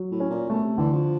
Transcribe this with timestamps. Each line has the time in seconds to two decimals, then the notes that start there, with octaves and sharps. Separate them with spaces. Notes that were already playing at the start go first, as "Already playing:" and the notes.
Already playing: F#3
0.11 A2
0.20 C#4
0.30 A#2
0.49 B2 A3
0.64 C3
0.78 D3 E3
0.93 F3